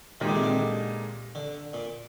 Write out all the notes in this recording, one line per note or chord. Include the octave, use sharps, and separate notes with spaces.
A#2 D#3 G#3 D#4 G4
D3
C3
D3
D3
A#2